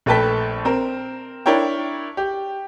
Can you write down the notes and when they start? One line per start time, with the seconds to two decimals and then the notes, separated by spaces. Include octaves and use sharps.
0.06 A#1 A3 B4 G5 A5 B6
0.65 C4 A#4
1.46 D4 E4 A#4 C#5 G5
2.17 G4